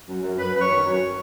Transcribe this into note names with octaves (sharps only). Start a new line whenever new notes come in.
F#2
F#2
F#2 B4
F#2 B4
C#5
D#3
F#2